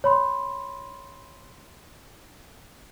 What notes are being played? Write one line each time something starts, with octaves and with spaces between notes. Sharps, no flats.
C#5 B5 C6